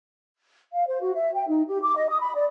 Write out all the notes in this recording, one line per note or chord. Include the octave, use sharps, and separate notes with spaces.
F5
C5
F#4
E5
G5
D#4
G4
D6
D#5
D#6
B5
D5